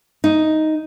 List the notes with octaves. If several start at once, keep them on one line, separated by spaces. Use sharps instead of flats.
D#4